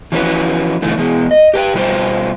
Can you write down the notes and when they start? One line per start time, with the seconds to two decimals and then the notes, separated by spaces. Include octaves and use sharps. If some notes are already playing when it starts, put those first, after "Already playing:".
0.12 E3 F3 C#4 F#4 B4
0.82 B2 D3 E3 A3 D4
0.97 E2 B2 G#3
1.31 D#5
1.54 G4 B4 G5
1.74 B2 G3 F4 C5 G5